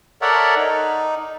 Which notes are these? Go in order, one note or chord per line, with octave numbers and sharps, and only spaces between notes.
A4 A#4 C#5 D5 E5 F#5
D#4